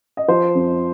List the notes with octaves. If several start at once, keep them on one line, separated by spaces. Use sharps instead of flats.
D#5
F3 C5
F2